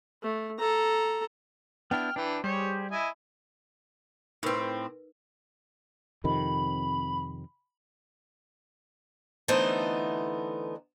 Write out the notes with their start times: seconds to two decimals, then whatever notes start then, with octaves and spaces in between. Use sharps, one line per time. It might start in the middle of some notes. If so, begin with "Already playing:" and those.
0.23 A3
0.59 A4 A#5
1.91 B3 D4 E4 G5 F6
2.16 E3 D4 B4
2.44 G3 G4 G#4 C5 C#5
2.91 E4 D#5 G#5
4.43 A2 C4 D#4 A#4 B4
6.24 F2 C3 D#3 B5
9.48 D3 E3 A3 B3 D#4 C5